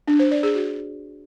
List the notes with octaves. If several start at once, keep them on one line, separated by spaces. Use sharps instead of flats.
D4
C5
D5
G#4
F#4